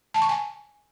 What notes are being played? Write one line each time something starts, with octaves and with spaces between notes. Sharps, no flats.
A5
C#6
G#5